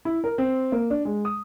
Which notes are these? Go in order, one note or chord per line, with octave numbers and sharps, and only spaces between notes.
E4
A#4
C4
A#3
D4
G#3
D#6